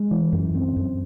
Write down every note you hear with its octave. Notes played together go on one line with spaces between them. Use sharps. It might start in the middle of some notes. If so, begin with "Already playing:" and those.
Already playing: G#3
E3
F#2
C4
F#2